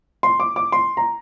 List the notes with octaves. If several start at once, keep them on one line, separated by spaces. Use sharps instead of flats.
C6
D6
D6
C6
A#5